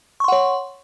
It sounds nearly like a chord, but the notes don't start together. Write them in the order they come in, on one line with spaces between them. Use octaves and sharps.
C#6 C6 F#5 C#5